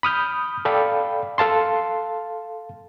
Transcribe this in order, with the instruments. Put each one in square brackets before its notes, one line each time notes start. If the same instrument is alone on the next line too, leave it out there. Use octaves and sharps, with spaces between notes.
[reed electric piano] B5 D#6 F6 G6
A4 D5 F5 G5 B5
A4 F5 A5 C6